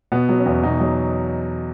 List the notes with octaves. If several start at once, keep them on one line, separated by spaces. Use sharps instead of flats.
B2 B3
F#3
C#4
E2
B2 D#4
F#3